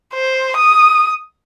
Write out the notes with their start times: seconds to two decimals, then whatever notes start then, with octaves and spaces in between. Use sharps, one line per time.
0.14 C5
0.57 D#6